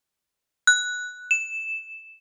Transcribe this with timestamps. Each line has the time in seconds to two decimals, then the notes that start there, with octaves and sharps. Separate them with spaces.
0.67 F#6
1.31 E7